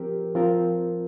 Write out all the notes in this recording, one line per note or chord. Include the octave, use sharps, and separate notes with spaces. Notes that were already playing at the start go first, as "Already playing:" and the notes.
Already playing: F3 C4 G4 A#4
F3 C4 F4 A#4